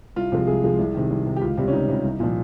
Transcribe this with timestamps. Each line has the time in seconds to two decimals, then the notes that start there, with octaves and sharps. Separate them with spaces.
0.16 C2 F4
0.32 C3 F3 G#3
0.47 C2 G#4
0.63 C3 F3 G#3
0.79 C2
0.94 C3 D#3
1.11 C2
1.26 C3 D#3
1.36 G4
1.41 C#2 F4
1.57 C3 G3
1.68 C#4
1.73 C#2 D#4
1.88 C3 G3
2.04 C2
2.20 A#2 F3